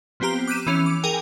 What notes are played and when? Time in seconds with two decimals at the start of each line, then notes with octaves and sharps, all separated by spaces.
0.20 F3 B3 C4 G4 A#5 F6
0.48 D6 F#6 G6 B6 D#7 E7
0.67 E3 C#4 F7
0.86 D6
1.04 G#4 A#4 G5 G#5